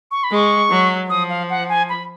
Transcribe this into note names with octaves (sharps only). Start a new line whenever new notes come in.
C#6
B5
G#3 C#6
F#3
F3 D#6
F5
F#5
G#5
B5